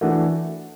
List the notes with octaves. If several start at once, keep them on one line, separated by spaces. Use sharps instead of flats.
E3 A3 D4 F#4